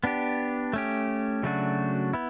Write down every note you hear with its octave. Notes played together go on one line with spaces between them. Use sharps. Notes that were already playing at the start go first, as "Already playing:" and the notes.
B3 D4 G4
A3 C#4 G4
C#3 F#3 A3 D4 F#4
B3 E4